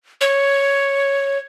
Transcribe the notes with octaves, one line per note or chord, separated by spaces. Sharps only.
C#5